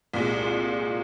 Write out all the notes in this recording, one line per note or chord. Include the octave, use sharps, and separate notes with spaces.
C2 A#2 G#3